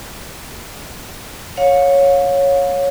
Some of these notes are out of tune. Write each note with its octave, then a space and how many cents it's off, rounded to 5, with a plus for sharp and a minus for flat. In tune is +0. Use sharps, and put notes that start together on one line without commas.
C#5 +0 F5 +35